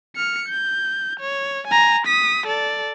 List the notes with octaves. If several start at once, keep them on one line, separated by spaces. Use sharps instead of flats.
F6 C#7
G6
C#5
G#5 A#5
D#6 B6
A4 D5